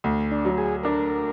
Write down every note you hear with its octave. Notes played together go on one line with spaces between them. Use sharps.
D2
D4
F#3
G#4
D4 A#4